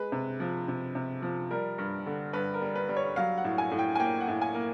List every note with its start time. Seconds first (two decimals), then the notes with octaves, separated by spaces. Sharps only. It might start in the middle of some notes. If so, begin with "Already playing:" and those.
Already playing: G#3 B4
0.12 C3
0.40 F3
0.68 C3
0.95 C3
1.22 F3
1.51 G3 A#4
1.78 G2
2.06 D3
2.33 G2 B4
2.54 A#4
2.62 G3
2.75 B4
2.89 G3
2.97 C#5
3.16 F#3 F5
3.38 F#5
3.44 A2
3.58 G#5
3.72 A2
3.79 G5
3.95 G#5
3.99 A#3 G5
4.20 F#5
4.28 A2
4.42 G#5
4.55 A#3